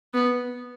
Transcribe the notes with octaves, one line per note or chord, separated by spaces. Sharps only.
B3